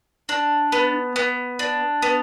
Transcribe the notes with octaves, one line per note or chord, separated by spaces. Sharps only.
D4
B3
B3
D4
B3